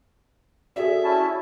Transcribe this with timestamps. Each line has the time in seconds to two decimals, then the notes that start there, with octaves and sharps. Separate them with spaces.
0.76 F#4 G#4 A4 D5 E5
1.04 C#4 E4 A5